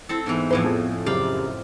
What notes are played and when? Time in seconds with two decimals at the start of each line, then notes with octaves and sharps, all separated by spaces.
0.09 C4 E4 A4
0.26 G#2 E3 B3
0.51 F2 A2 B4 C6
0.64 F3 G#4
1.06 F#2 C#3 G4 D5 F5 G5